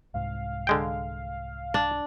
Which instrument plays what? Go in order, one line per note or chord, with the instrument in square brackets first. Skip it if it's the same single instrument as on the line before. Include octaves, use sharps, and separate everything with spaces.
[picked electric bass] C2 G#2 [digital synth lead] F5
[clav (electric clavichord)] D3 G#3 G5
[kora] D4